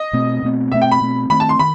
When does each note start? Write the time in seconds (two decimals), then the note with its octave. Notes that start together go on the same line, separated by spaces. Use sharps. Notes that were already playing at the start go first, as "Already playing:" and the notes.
Already playing: D#5
0.13 B2 A3 C4
0.43 B2 A3 C4
0.72 B2 A3 C4 E5
0.82 G5
0.92 B5
1.01 B2 A3 C4
1.30 D#3 A3 C4 B5
1.40 A5
1.49 C6
1.59 D#3 B5